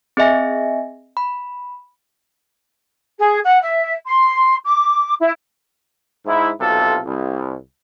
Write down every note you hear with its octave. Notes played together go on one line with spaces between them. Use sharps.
C4 G#4 D#5 E5 G#5 A#6
B5
G#4
F#5
E5
C6
D6
E4
G#2 E4
B1 C3 F4 A4
C2